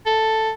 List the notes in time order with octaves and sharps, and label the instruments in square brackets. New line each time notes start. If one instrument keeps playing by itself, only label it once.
[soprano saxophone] A4